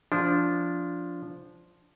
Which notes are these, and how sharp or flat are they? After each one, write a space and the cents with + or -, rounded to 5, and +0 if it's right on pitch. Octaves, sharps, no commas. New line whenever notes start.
F3 +0 D4 -15